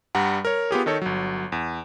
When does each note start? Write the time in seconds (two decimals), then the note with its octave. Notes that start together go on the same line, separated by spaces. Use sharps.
0.15 G2 G3 F#5 A#5
0.45 A#4 C#5
0.71 B3 F4 G4 G#4
0.86 D#3 D#4 A4 C#5
1.02 G1 F#3
1.52 E2